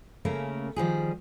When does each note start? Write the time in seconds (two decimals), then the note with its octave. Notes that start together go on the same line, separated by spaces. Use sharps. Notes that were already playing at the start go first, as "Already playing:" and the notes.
0.25 C#3 A3 A#3 C#4 A#4
0.76 D#3 F3 G3 G#4